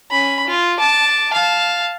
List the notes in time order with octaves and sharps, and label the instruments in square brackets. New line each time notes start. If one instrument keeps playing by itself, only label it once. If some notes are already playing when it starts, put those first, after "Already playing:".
[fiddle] C#4 B5
F4
A5 D6
F5 A5